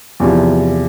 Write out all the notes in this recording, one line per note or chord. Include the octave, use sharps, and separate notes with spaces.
E2 C3 F3